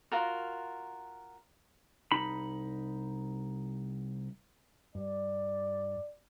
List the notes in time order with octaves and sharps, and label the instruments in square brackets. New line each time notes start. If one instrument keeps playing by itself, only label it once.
[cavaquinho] F4 F#4 A#4
[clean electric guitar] C2 D#4 B5
[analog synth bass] G2 [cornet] D5